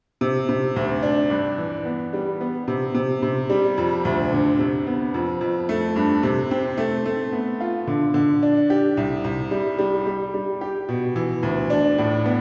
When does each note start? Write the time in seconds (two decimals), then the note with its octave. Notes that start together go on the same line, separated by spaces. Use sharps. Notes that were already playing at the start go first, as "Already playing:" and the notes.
0.21 C3
0.49 C3
0.76 D2
1.03 D4
1.30 G2
1.58 E3
1.85 B3
2.13 G3
2.41 B3
2.68 C3
2.95 C3
3.22 C3
3.50 G3
3.77 F2
4.05 D2
4.32 D3
4.59 C3
4.87 B3
5.14 F2
5.41 F2
5.69 A3
5.96 G2
6.23 C3
6.51 C4
6.77 A3
7.05 A3
7.33 B3
7.61 F4
7.87 D3
8.14 D3
8.43 D4
8.70 G4
8.97 C2
9.24 C2
9.51 G3
9.79 G3
10.07 G3
10.34 G3
10.61 G4
10.89 B2
11.16 E3
11.43 D2
11.70 D4
11.98 A2
12.26 B3